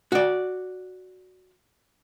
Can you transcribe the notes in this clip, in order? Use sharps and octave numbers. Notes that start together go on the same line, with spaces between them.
F#4 D5